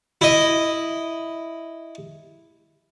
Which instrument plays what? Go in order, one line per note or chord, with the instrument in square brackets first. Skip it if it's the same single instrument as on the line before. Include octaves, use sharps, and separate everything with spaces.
[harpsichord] E4 D#5